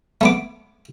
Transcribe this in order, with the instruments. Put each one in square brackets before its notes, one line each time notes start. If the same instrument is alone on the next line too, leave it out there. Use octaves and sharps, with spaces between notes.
[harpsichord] A3 B3 D6